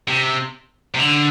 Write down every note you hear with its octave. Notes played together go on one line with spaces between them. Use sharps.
C3
C3
D3